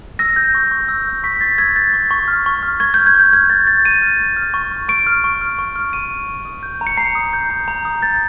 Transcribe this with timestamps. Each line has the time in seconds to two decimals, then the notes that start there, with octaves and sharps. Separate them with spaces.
0.19 E6 A#6
0.36 G6
0.55 C#6
0.71 C#6
0.89 E6
1.07 G6
1.24 C#6 B6
1.41 C#6 A6
1.58 E6 G#6
1.75 G6 A6
1.93 C#6
2.11 C#6
2.28 F6
2.46 C#6
2.63 F6
2.80 C#6 G#6
2.94 G6
2.98 F6
3.07 G#6
3.15 C#6 G6
3.33 F6 G#6
3.50 C#6 A6
3.67 F6 A6
3.85 C#6 D#7
4.02 F6
4.20 C#6
4.36 F6
4.54 C#6
4.72 F6
4.89 C#6 D7
5.07 F6
5.24 C#6
5.41 F6
5.59 C#6
5.76 F6
5.93 C#6 D#7
6.11 F6
6.28 C#6
6.45 D#6
6.63 G6
6.81 A#5
6.87 C#7
6.97 A#5 C7
7.15 D#6
7.33 G6
7.50 A#5
7.68 A#5
7.85 D#6
8.02 G6 A6